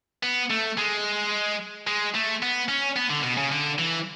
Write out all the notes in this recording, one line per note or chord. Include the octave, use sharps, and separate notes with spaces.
B3
A3
G#3
G#3
A3
B3
C#4
B3
D3
B2
C#3
D3
E3